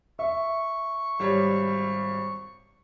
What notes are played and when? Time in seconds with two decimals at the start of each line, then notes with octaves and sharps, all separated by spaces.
0.19 E5 C#6
1.19 G#1 G3 C#5